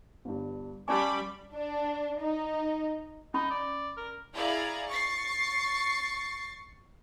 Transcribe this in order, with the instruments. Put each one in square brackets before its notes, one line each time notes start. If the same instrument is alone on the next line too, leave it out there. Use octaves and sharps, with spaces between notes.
[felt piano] G1 G2
[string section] G3 B5 [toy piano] C#4 D5 G#5 [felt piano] A5 C#6 [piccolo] D6
[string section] D4
D#4
[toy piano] C#4 B5 [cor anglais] D#4
[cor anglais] D5
A#4
[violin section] E4 G#4 D5 F5 A#5 G#6
C#6 A6 C7